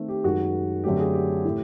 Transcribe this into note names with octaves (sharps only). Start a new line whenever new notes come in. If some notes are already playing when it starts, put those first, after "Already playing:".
Already playing: D#3 A3 C4
G4
F#2 D#3 G#3 F#4
F#2 D3 F#3 A3 C4 G4
G#4
G4
A2 E3 A3